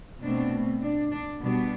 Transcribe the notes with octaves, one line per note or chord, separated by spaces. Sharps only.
B2 A3 C4 D4
D4
D4
B2 G3 B3 D4